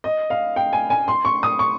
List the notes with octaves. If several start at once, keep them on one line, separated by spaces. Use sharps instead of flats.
D#5
F5
G5
G#5
G#5
C6
C#6
D#6
C#6